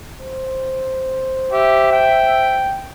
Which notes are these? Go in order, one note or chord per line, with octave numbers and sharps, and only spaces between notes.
C5
G4 E5
G5